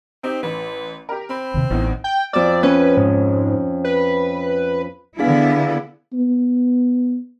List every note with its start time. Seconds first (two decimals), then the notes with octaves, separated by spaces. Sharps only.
0.23 C4 D#4 G4
0.43 A1 B4
1.09 G4 A#4
1.30 C4 B5
1.54 D#2 C3
1.71 A1 E2 A2 D#4
2.04 G5
2.33 F2 D5 E6
2.63 C#4 B4
2.97 G#2
3.84 B4
5.19 D3 B3 D4 E4 G#4 F5
6.13 B3